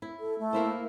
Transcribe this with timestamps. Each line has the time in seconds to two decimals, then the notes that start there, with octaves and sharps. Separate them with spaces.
0.02 E4
0.20 A4
0.39 A3
0.53 A#3 E4 C5